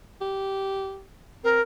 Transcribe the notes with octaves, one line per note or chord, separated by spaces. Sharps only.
G4
C4 A#4